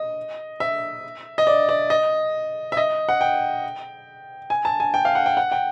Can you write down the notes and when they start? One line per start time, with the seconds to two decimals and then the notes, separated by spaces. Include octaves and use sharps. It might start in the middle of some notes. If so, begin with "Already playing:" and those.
Already playing: D#5
0.60 E5
1.38 D#5
1.47 D5
1.69 D5
1.90 D#5
2.72 E5
2.77 D#5
3.09 F#5
3.21 G5
4.50 G#5
4.65 A5
4.80 G#5
4.94 G5
5.05 F5
5.15 F#5
5.26 G5
5.37 F#5
5.52 G5